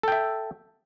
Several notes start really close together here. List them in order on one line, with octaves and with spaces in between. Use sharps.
A4 G5 E5